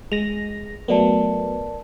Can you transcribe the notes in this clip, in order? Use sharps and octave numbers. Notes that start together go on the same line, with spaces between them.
G#3 A#6 F7
F#3 A3 B3 A#4 D5 A5